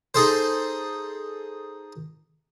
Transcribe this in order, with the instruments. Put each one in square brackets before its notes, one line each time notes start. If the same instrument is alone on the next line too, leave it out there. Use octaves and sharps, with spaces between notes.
[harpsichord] D#4 G#4 A4 C5